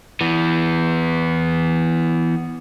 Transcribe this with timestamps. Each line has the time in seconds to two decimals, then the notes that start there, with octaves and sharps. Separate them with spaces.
0.21 E3 B3